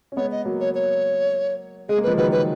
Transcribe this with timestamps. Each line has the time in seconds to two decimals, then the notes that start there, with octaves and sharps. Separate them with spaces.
0.12 C#4
0.16 G#3 B3 C#5
0.31 D#5
0.45 F#3 A#3
0.60 C#5
0.75 C#5
1.89 G#3 G#4
1.98 A#3
2.03 F3 G#3 B4
2.17 D#3 F#3 B4
2.32 B4